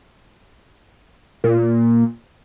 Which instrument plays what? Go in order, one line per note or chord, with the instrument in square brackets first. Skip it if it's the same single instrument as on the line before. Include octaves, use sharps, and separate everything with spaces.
[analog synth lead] A#2